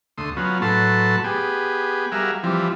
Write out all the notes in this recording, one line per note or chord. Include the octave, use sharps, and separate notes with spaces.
D2 A3 C6 D#6
F#3 B3 C#4 F4
A2 F#3 A4 B4 A5 C6
B3 G4 G#4
G3 F#4 G#4 A#4 E5 F5
E3 F3 G3 C4